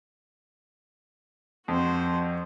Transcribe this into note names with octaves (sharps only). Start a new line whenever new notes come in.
F2 F#4 C5